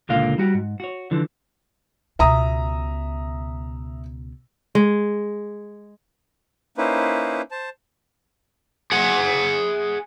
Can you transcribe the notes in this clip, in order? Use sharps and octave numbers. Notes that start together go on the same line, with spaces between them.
C#2 A#2 D3 A#3 F4 F5
G3 F#4 G4
G#2
F#4 C#5
D3 E3 F3
C#2 B2 E5 A#5 D#6
G#3
A#3 C#4 D#4 E4 B4 C5
C5 A5
G#4 F#5